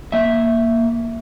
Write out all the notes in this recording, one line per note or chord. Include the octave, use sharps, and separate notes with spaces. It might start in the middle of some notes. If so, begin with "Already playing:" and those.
A#3 E5